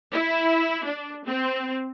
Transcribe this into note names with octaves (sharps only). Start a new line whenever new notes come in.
E4
D4
C4